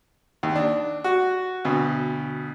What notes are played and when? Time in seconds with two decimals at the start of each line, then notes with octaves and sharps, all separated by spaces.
0.43 D#2
0.55 D4
1.04 F#4
1.65 D2 B2